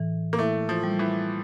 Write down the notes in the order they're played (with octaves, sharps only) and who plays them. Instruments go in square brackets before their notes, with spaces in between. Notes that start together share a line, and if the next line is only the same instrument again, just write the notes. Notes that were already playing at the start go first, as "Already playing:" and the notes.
Already playing: [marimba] A2 E3
[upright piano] A#3
[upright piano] A3 [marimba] E4
[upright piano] F3
[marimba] G3
[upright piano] E3